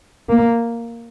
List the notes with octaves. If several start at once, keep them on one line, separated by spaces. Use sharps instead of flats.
A#3